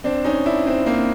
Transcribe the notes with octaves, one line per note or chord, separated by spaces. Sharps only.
C4 D4
C#4 D#4
D4 E4
C4 D4
A#3 C4